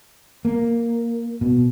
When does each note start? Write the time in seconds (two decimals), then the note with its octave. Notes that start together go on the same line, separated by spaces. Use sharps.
0.45 A#3
1.41 B2